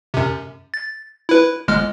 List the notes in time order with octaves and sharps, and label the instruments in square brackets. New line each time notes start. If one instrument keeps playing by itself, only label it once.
[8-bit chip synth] F#2 C3
A6
E4 B4
G1 G#3 F6